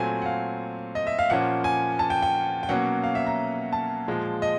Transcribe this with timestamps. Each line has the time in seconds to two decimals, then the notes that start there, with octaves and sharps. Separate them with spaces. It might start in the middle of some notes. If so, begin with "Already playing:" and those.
Already playing: A#2 F#3 A3 C4 G#5
0.22 F#5
0.26 F5
0.95 D#5
1.07 E5
1.19 F5
1.30 A#2 F3 A#3 C#4 F#5
1.64 G#5
1.99 A5
2.10 G5
2.22 G5
2.63 G5
2.69 B2 F#3 A#3 C#4 F#5
3.04 F5
3.15 E5
3.27 A#5
3.73 A5
4.08 A#2 F3 G#3
4.42 D#5